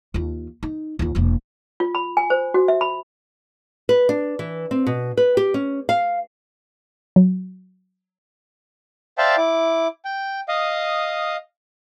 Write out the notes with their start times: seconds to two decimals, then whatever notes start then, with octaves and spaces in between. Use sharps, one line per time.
0.14 D#2 F4
0.63 D#4
0.99 D#2 F4
1.15 E1 A#3
1.80 F4
1.95 B5
2.17 G#5
2.30 C5
2.54 F#4
2.68 E5
2.81 B5
3.89 B4
4.09 D4
4.39 E3
4.71 C4
4.87 B2
5.17 B4
5.37 G4
5.54 C#4
5.89 F5
7.16 F#3
9.18 C5 D5 E5 F5 G5 A5
9.38 E4 D6
10.05 G5
10.48 D#5 F5 D#6